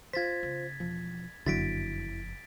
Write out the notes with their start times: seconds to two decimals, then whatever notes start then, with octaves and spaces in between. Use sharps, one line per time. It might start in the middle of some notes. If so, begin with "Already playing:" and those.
0.13 F4 C5 G#6 A6 B6
0.43 C#3
0.80 E1 F3
1.46 F#1 F2 D3 F#3 E4 A6 B6 D7